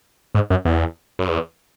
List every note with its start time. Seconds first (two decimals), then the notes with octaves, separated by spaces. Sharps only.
0.35 G#2
0.50 F#2
0.65 E2
1.19 F#2
1.29 E2